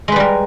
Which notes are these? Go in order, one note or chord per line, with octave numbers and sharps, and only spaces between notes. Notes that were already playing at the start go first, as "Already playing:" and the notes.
G3 G#3 A#4 B4